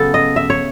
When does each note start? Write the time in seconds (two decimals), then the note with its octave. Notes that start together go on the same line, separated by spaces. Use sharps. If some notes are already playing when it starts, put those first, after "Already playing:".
Already playing: C#3 F#3 B3 A4
0.14 D#5
0.36 E5
0.50 C#5